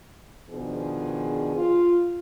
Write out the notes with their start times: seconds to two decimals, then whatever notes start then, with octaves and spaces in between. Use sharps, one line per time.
0.51 B2 D#3 F3 D4 G#4
1.55 F4